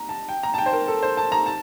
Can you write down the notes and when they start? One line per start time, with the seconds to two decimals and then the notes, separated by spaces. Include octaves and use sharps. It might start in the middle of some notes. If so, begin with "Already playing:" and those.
Already playing: A#5
0.09 A5
0.29 G5
0.43 A#5
0.54 A5
0.58 G5
0.66 C5
0.73 A#4
0.88 A4
1.03 C5
1.17 A5
1.32 A#5
1.46 A5